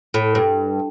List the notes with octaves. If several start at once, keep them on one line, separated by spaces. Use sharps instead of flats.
A2
G2